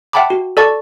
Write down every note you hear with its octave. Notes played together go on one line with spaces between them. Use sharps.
E5 F#5 G5 A5 B5 D6
F#4
A4 D5 A5 C#6